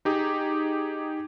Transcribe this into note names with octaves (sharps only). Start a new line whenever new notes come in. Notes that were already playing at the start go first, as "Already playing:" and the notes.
D#4 G4 G#4